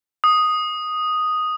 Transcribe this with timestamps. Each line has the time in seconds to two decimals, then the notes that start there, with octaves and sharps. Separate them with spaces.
0.24 D#6